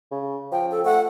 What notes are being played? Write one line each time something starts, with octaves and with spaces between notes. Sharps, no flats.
C#3
F3 G5
A4
A3 F#5